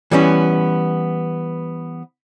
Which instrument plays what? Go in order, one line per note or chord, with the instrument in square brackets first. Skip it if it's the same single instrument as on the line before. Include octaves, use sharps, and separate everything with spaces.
[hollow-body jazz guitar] E3 G3 B3 C#4